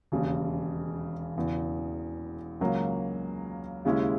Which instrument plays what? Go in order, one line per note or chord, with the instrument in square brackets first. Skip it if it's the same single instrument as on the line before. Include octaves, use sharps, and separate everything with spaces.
[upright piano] E1 D#2 C#3
E1 E2 C#3 E3
C#2 C#3 F#3 A#3
D#2 C#3 G#3 C#4 E4